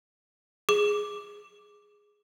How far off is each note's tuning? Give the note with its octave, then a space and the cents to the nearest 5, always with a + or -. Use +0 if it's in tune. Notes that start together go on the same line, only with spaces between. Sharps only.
G#4 +0 D6 +0